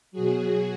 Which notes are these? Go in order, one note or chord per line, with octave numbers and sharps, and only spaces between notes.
B2 F#3 F#4 G#4